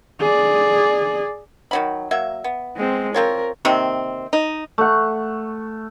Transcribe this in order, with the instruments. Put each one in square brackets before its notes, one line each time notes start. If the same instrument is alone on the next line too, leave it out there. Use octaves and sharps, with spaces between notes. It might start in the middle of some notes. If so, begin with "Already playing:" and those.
[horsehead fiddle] G#4 D5
[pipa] D#3 F#3 B5
F#3 A#3 E5
B3
[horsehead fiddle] G#3 C4
[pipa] C4 F4 C#5 [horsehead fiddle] A#4
[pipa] C3 D#3 A#3 C4
D#4
[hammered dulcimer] A3 F#5